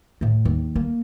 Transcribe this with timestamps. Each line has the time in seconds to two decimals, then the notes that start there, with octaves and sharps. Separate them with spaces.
0.21 A2 A3
0.45 D#2
0.76 A#3